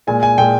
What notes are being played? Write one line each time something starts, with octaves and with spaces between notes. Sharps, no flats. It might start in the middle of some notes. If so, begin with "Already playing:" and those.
A#2 G#3 G#5
G#5
A#2 G#3 G5